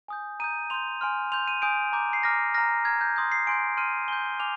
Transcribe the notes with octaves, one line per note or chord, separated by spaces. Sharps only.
G#5 D#6 G6
A#5 D#6 G6 D#7
C6 G6 F7
G#5 C6 F6
C6 G6 F7
D#7
G#5 D#6 G6 D7
A#5 D6 G6
C7
A#5 D6 F6 A#6
A#5 F6 A#6
A#5 F6 G#6
G6
C6 D#6 G6
C7
G#5 C6 G6 D7
C6 F6 D#7
G#5 C6 G6 G7
G#5 D6 F6 F7